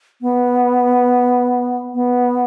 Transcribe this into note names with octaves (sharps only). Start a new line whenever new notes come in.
B3
B3